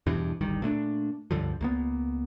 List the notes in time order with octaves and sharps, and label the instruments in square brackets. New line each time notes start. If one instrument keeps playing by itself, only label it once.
[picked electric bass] E2 G2 B2 E3
D1 G1 D#3 G3
A#2 A3 B3 D4
C#2 G2 D3 F3
C#2 A#3 B3